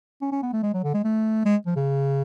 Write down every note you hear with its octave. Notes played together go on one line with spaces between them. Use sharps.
C#4
C#4
B3
A3
G#3
F#3
D3
G#3
A3
G#3
F3
C#3